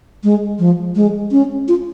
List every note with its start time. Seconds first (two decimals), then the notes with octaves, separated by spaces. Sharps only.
0.24 G#3
0.59 F3
0.95 G#3
1.32 C#4
1.68 F4